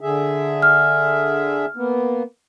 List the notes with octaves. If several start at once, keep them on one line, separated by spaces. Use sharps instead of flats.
D3 G#4 E5
F6
A#3 B3